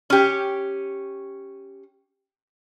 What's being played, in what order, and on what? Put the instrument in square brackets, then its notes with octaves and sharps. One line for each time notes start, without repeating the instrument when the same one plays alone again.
[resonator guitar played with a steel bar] C#4 G4